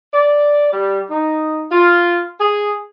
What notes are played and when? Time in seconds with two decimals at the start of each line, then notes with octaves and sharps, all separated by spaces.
0.13 D5
0.71 G3
1.10 D#4
1.71 F4
2.39 G#4